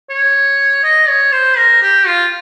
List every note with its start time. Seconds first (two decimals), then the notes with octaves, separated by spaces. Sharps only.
0.10 C#5
0.83 D#5
1.08 C#5
1.32 C5
1.58 A#4
1.82 G4
2.07 F4